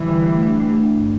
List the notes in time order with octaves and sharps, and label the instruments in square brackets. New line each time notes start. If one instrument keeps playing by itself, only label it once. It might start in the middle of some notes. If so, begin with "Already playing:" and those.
Already playing: [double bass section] E3 G3
[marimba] D3
A3
D4
A3
D4
G2